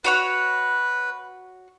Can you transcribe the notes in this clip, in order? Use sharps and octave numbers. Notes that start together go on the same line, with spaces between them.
F#4 B4 C#5 F#5